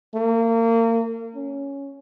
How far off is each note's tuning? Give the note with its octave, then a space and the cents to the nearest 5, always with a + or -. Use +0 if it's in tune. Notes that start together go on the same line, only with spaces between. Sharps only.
A#3 -30
C#4 +5